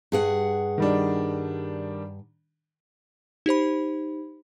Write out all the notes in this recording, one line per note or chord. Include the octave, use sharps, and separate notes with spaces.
G2 G#4 F#5
D#3 G3 D4
D#4 G4 C5 B5